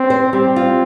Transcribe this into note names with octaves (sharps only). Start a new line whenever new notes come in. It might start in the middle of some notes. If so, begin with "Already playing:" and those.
Already playing: C4
C5
G3 C4
F4